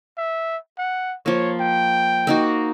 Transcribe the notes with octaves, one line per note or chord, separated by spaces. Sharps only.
E5
F#5
F3 A#3 C#5
G5
A#3 D#4 F#4